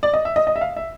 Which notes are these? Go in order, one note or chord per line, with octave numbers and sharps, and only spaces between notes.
D5
D#5
E5
D#5
D#5
E5
F5
E5